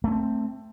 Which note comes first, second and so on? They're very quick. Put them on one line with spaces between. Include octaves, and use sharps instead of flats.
A3 C#4 C4